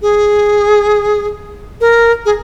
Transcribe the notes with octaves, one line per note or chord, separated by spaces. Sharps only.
G#4
A#4
G#4